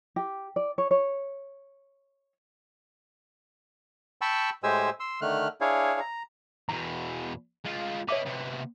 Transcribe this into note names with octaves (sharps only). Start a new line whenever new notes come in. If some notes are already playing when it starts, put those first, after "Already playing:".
G4
D5
C#5
C#5
G5 A5 B5 C#6 E6
A2 G#3 G4 C5 G#5 E6
C6 E6
D3 D#3 A3 F6 F#6
D4 E4 G#4 C#5 F5
A#5
E2 B2 A#5
G#3 F4
B4 C#5 D#5 E5 D6
C3 B3